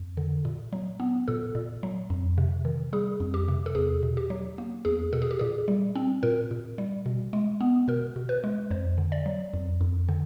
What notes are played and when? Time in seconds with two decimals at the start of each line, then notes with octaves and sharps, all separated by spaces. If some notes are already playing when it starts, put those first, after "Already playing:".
Already playing: F2
0.17 D3
0.45 A#2
0.73 F#3
1.00 B3
1.28 A#2 A4
1.55 A#2
1.83 F#3
2.10 F2
2.38 C3
2.65 D#3
2.93 G3 G#4
3.20 F2
3.34 G4
3.48 C3
3.66 A4
3.75 E2 G#4
4.03 B2
4.17 G4
4.30 F#3
4.58 A#3
4.85 E2 G#4
5.13 B2 A4
5.22 G#4
5.31 G4
5.39 A#2 G#4
5.68 G3
5.95 C4
6.23 A#2 A#4
6.51 A#2
6.78 G3
7.06 B2
7.33 G#3
7.61 B3
7.88 B2 A#4
8.16 B2
8.29 B4
8.44 G#3
8.71 F2 C5
8.98 D3
9.12 D5
9.26 F#3
9.53 F2
9.81 F2
10.09 D3